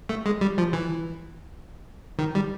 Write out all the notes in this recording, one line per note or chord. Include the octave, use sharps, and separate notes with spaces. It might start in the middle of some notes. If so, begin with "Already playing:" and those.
A3
G#3
G3
F3
E3
D#3
G3